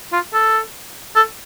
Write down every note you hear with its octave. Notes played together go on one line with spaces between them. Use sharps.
F4
A4
A4